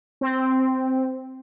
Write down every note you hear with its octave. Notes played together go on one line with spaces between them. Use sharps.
C4